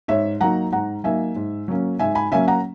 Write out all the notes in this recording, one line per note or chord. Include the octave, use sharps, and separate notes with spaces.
G#2 C#5 E5
F#3 A#3 D#4 F#5 A#5
G#2 F#5 A#5
F#3 A#3 D#4 E5 G#5
G#2
F#3 A#3 C#4
G#2 E5 G#5
G#5 B5
F#3 A#3 C#4 E5 G#5
F#5 A#5